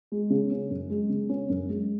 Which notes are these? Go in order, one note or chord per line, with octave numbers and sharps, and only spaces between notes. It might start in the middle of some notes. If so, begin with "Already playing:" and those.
G#3
C#3
C#4
F#2
G#3
C#3
C#4
F#2
G#3